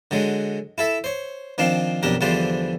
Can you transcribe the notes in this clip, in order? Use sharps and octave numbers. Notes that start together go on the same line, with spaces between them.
D3 F#3 G#3
E4 A4 E5
C5 C#5
D#3 F3 C4 D4 F5
B1 F2 D4 G4 A#4
E2 D3 F3 G3 D4 C5